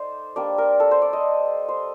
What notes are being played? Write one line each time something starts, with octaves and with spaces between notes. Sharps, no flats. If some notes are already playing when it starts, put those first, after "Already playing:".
Already playing: A3 D#4 C5 D5
G3 A#3 D4 D5
A#4
A4
C5
D5
D#5
C5